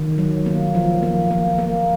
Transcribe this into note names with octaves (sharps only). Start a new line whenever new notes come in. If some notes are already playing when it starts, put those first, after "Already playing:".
Already playing: D#3
F#3
A#3
F3
A#3
A#3
A#3